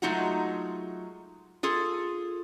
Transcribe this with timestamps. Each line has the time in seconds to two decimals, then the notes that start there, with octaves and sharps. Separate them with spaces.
0.02 F#3 G#3 A3 D#4 F4 F#4
1.63 F4 G#4 A4